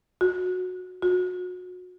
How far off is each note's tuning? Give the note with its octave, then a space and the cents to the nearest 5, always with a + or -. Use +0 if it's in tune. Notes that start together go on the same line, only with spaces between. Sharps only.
F#4 -15
F#4 -30